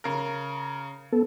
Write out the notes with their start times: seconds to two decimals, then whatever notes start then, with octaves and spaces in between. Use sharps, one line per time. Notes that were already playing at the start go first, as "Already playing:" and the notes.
0.04 C#3 A#4
1.12 B3 A4